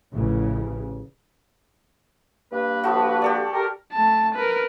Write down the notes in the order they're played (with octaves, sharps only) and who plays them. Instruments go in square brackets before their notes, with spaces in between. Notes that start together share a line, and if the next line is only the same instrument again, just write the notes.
[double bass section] A1 A2 C#3 E3 F3
[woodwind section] G2 A#3 B4
[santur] F3 A3 F#4
G4 A4 D5
[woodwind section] G4 A#4
[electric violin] A3 A5
A#4 B4